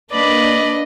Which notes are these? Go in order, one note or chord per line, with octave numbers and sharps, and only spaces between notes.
A#3 D4 B4 D5 D#5 B5